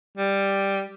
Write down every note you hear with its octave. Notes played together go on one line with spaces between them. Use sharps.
G3